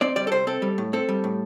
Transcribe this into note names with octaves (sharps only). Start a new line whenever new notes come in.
C4 D5
G3 D5
A4
C3 C5
C4 A4
G3
A2
C4 A4
G3
A2